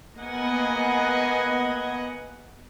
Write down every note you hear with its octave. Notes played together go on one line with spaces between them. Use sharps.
A#3 B3 D#5 F#5 G#5